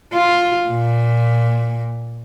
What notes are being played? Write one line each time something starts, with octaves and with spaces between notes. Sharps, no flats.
F4
A#2